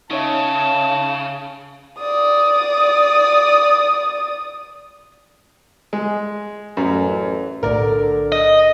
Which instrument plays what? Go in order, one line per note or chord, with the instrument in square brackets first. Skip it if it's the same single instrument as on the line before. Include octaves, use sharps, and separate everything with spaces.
[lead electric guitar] C#3 [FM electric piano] D#4 C#5 E5 [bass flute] F5 [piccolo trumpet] A5
[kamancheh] D5 D#6
[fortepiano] G#3
[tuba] A1 [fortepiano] F#2 F#3
[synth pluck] B1 A2 [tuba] D3 [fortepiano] A#4 D5
[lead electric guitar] D#5